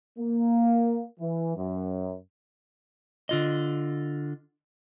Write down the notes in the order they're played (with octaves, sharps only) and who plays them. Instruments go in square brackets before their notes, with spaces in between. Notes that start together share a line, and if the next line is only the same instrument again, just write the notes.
[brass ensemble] A#3
E3
F#2
[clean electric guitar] D3 F4 D#5